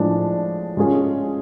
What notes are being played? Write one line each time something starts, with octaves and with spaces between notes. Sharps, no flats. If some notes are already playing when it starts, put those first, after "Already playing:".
Already playing: A2 F3 G#3 D4
G#3 C#4 F4 G#4